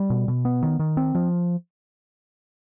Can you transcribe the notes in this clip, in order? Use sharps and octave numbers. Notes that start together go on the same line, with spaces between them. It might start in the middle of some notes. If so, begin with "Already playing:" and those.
Already playing: G3
B2
B2
B3
D#3
D#3
C4
F3